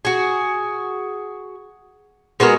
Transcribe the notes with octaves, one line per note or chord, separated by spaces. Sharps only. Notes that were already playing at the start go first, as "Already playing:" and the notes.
F#4 G#4
G#3 B3 F#4 A#4